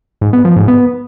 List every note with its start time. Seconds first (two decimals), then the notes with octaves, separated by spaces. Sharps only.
0.21 G#2
0.33 B3
0.45 F3
0.56 G#2
0.68 B3